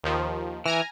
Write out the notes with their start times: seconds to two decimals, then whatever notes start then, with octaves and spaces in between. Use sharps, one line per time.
0.04 D#2 D#3 F3
0.66 E3 G#5 A#5 F6